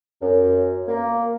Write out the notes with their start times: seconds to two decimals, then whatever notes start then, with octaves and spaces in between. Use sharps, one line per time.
0.21 F#2
0.88 A#3